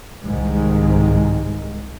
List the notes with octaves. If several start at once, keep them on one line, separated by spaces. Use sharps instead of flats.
C2 G#2 D#3 G#3